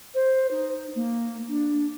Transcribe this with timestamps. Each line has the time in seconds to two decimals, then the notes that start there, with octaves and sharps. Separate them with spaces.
0.14 C5
0.51 D#4
0.95 A#3
1.48 D4